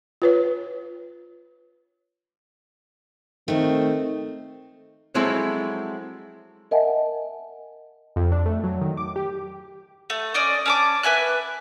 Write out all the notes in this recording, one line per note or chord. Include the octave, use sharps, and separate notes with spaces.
F4 B4 C#5
D#3 A3 C4
F3 F#3 G#3 C4 E4 A4
A#4 D#5 E5 F#5 G#5 A5
F2
D4
A3
F#3
D#3
D6
G4
A3
C#4 D5 D#5
C#4 A5 D6
B4 E5 G#5 F#6